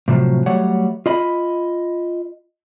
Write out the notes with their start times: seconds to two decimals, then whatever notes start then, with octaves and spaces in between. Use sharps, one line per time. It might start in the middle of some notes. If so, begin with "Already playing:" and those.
0.08 A2 C3 F3 F#3
0.46 F#3 G3 A3 C#5 F#5
1.06 F4 D#5 B5